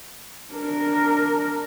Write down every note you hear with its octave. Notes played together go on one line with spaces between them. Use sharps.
D4 A#4